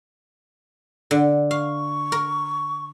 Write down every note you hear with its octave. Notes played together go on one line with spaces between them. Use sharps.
D3
F5 C#6
A#4